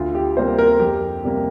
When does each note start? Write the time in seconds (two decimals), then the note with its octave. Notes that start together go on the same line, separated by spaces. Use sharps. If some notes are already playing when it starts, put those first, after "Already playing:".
Already playing: D2 F4
0.15 G4
0.36 C3 G3 A#3 C5
0.58 A#4
0.80 F2 G4
1.24 C3 G3 A#3